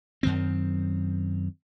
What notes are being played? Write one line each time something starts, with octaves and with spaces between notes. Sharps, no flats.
F#2 D#3 C4